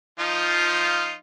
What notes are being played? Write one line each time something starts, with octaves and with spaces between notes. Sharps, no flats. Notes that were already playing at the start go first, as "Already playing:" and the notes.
F3 D#4 F4